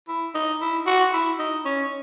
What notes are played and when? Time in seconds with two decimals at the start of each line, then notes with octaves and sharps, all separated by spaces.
0.08 E4
0.34 D#4
0.61 E4
0.86 F#4
1.13 E4
1.39 D#4
1.65 C#4